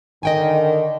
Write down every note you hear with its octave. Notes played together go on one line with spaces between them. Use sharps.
D3 D#3 D#5 G5 G#5